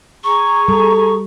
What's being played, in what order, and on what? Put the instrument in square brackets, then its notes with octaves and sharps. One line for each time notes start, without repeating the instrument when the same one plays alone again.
[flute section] G#4 A#5 [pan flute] C#6
[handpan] G3 [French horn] A4